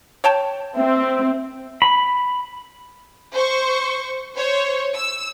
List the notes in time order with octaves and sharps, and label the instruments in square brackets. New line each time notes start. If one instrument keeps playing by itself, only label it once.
[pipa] C#5 G5 A5
[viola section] C4 [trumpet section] E5
[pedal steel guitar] B5
[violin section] C5 C#6
C5 C#5
E6